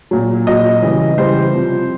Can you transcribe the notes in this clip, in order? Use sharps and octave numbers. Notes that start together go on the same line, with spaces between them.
A#2 F#3
A#2 F#3 D#5
C#3 E3 G3
C#3 E3 G3 C5
C3 F3